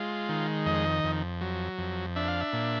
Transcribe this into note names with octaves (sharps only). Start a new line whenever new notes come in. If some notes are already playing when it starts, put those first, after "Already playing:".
Already playing: G#3 F4
D#3
F2 D#5
F2
F#3
F2
D4 E5
F5
E5
A#2